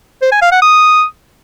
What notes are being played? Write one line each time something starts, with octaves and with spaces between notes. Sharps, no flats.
C5
G#5
F5
F#5
D#6